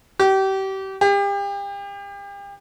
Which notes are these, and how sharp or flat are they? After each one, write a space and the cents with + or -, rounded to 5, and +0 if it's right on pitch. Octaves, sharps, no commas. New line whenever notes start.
G4 -30
G4 +35